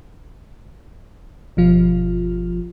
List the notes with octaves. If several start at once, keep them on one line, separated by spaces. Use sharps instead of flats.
G1 B2 F3 F4